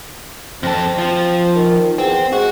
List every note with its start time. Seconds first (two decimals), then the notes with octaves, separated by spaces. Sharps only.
0.63 F2 C4 A4
0.98 F3
1.55 D#3
1.98 E2 C4
2.33 G#3 F#4